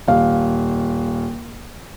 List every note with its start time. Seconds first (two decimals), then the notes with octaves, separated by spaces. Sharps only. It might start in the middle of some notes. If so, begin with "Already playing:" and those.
0.08 D#1 F5